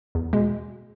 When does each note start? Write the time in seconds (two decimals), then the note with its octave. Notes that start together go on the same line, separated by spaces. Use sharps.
0.15 E2
0.33 B2 G#3